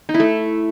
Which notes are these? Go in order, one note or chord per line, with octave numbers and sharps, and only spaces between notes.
D#4
E4
A3